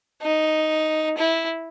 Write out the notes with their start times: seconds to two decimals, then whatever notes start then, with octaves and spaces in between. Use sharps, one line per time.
0.22 D#4
1.17 E4